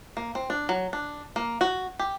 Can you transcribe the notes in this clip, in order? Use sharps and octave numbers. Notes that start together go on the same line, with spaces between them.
A#3
C4
D4
F#3
D4
A#3
F#4
G4